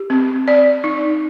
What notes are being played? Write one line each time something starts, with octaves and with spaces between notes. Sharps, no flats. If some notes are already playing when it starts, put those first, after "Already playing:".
Already playing: G4
C4
D5
D#4